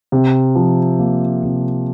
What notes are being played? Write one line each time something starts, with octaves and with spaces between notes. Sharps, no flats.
C3
F3
A#3
C3